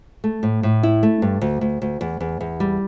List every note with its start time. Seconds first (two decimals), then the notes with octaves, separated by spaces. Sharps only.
0.24 A3
0.43 A2
0.63 A2
0.83 E4
1.03 A3
1.22 G2
1.41 D2
1.61 D2
1.82 D2
2.01 E2
2.20 E2
2.41 E2
2.60 G3